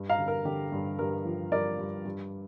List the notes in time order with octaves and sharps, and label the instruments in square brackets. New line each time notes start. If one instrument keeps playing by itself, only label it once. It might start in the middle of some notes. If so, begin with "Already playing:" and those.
Already playing: [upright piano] G2
F5 A#5
D3
A#4
D3 G4
G2
G2 A#4
F3
G2 A#4 D5
G2
G2